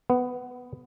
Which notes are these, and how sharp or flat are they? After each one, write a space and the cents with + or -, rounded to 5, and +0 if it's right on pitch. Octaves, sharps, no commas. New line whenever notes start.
B3 +10